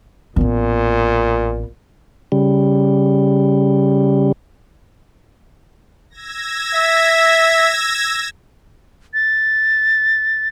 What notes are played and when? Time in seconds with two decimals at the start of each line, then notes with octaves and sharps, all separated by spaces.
0.36 A1 A#2 B3
2.32 C#3 G3
6.10 E6 G#6 A#6
6.74 E5
9.14 A6